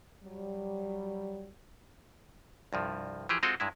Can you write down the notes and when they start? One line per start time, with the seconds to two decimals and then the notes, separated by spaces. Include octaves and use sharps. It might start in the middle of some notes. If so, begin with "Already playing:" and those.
0.23 F#3 G3
2.73 C2 G2 F3
3.29 E3 F3 G4 G#4
3.43 G#3 C4 F4 F#4 A4 D#5
3.60 G2 G#3 E4